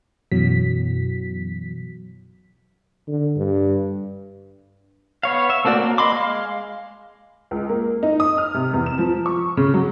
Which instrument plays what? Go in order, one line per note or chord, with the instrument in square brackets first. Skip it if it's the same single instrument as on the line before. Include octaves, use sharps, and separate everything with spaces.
[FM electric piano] F#2 B2 E3 F#3 B6
[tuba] D3
G2
[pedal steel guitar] B3 C#5 F5
E5
A3 A#3 C4 F#4 D5
A#3
D#5 B5 C6 D6
G#3 F5
[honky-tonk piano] C#2
A#3
D#4
D#6
F6
C3
E2
E7
F3
C#6
C#3
F#3